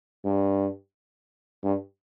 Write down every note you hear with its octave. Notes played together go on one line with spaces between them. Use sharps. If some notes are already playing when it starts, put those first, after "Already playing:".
G2
G2